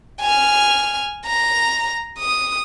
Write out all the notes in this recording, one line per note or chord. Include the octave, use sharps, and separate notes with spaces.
G#5 F6
A#5
D#6